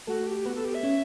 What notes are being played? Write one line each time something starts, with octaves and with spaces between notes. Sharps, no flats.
A3 F#4 A4
G4
B3 F#4 B4
A4
G4
E5
C#4 C#5